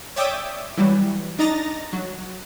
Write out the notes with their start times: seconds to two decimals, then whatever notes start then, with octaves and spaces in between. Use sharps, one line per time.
0.16 C#5 D5 E5 G5 D6 D#6
0.77 E3 F#3 G3
1.38 D4 D#4 D#5 A#5 A6 A#6
1.93 F#3